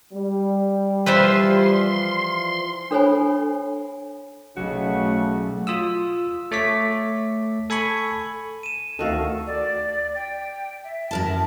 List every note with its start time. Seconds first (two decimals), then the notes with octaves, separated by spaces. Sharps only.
0.12 G3
1.06 E3 F3 B4 C5 E5 C6
2.91 D4 A4 C5 C#5 G#5 B5
4.57 B1 C#3 A3 F#4
5.67 F4 D#6 E6
6.52 A3 C#5 D6 B6
7.70 A4 G#5 B5 C#6
8.63 D#7 E7
8.99 D2 D#3 F#4 A4 F5 A#5
9.47 D5
10.15 G5
10.84 E5
11.11 F#2 A#4 A5